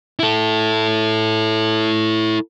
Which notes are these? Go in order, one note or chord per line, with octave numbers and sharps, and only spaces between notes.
E4 A4